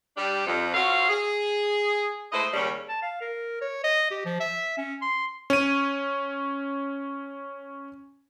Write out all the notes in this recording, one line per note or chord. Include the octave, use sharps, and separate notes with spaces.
G3 D4 G4
F2
F4 F#4 A4 C5 C#5 F5
G#4
G#3 A3 E4 B4 C5 D#5
D#2 C#3 G3 C#4
A5
F5
A#4
C#5
D#5
G4
F3
E5
C#4
C6
C#4 D#7